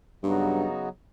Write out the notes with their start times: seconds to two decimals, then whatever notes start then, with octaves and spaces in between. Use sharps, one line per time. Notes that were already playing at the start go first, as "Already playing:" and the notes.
0.23 G2 C#3 F#3 B3 D#4 F#4